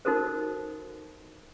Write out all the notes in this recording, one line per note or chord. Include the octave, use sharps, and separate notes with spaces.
D#4 F#4 A4 A#4 C5